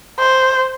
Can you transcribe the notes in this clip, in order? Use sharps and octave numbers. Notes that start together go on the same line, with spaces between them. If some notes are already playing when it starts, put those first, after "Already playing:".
C5